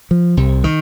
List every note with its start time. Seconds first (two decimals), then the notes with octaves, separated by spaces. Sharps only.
0.11 F3
0.37 C2 C3
0.64 D#3